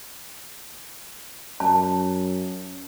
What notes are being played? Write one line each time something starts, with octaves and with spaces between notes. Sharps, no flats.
F#2 A5